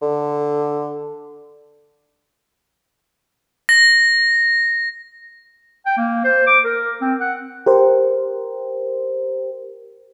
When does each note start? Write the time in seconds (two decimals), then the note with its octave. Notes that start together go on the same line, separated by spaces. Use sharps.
0.02 D3
3.69 A#6
5.86 G5
5.97 A#3
6.24 C5
6.47 D6
6.64 A#4
7.01 C4
7.20 F#5
7.66 G4 A#4 C5